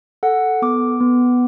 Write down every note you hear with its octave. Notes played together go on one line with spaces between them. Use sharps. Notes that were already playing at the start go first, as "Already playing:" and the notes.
A4 F#5
B3 D6
B3